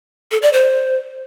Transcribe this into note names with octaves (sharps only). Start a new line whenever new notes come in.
A4
D5
C5